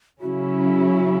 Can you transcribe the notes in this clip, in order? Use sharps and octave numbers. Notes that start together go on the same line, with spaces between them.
C#3 F#3 C#4 E4 F#4